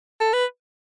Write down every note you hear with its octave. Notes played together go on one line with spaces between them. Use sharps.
A4
B4